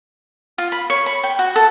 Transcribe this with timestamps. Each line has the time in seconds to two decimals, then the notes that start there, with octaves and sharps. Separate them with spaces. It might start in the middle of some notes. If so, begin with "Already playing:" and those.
0.58 F4
0.72 B5
0.90 C#5
1.06 B5
1.23 G5
1.39 F#4
1.56 A4